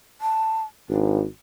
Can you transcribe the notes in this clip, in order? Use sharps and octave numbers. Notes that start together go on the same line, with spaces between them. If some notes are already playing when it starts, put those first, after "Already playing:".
A5
G#1 D4